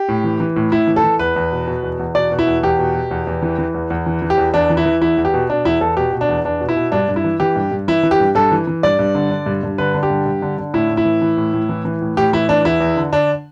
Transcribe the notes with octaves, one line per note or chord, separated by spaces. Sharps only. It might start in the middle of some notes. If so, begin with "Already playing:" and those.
Already playing: G4
A2
E3
E3
A2
A2 E4
E3
A4
E3
E2 B4
E2
B2
B2
E2
E2
B2 D5
B2
E4
E2
E2 G4
B2
B2
E2
E2
E3
E3
E2
E2
E3
E3
G4
E2
E2 D4
E3
E4
E3
E2 E4
E2
G4
B2
B2 D4
E2 E4
E2 A4
B2 G4
B2
D4
E2
E2 D4
B2
E4
B2
G2 D4
G2
E4
E3
E3 G4
G2
G2
E3 E4
E3
G4
G2
G2 A4
E3
E3
G2 D5
G2
D3
D3
G2
G2
D3 B4
D3
G4
G2
G2
D3
D3
A2 E4
A2
E4
E3
E3
A2
A2
E3
E3
A2
A2 G4
E3 E4
E3 D4
E2 E4
E2
D3
D3 D4